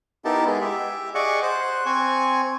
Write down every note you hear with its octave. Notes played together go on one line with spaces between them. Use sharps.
B3 D#4 E4 G4 A#4 A5
G#3 G#4
G4 E5
G#4 D5 D#5 F#5 C#6
C5 F#6
C4 G#5 C#6